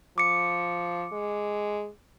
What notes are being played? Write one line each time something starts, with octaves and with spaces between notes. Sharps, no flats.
F3 D6 C#7
G#3